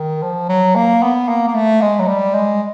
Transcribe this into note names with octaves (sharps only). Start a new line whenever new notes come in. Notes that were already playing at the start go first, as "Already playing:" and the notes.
Already playing: D#3
F3
F#3
A#3
B3
A#3
A#3
A3
G#3
F#3
G3
G#3